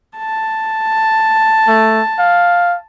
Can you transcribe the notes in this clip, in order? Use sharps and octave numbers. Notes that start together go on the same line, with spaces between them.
A5
A3
F5